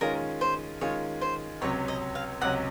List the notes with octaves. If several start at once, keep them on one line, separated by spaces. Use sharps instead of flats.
D#3 G#3 C#4 F4 A#4
C5
D#3 G#3 C#4 F4 C#5
C5
C#2 C3 F#3 C#4 C#5
D#5
F5
C#2 C3 F#3 C#4 F#5